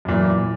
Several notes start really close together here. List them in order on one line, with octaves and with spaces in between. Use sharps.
F#2 A#2 E3